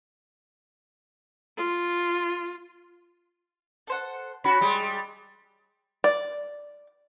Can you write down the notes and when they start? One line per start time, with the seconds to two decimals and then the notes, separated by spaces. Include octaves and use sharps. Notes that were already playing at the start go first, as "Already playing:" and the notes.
1.58 F4
3.87 A4 C5 F#5
4.44 C#4 F#4 B5
4.61 G3 G#3
6.04 D5